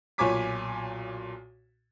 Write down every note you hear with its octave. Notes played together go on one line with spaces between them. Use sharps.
B1 A#2 C#5 G#5 D6 B6